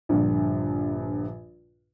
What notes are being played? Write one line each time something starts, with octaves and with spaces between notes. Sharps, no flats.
A#1 G2 D3